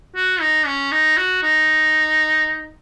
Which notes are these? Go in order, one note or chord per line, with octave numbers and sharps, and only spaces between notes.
F#4
D#4
C#4
D#4
F#4
D#4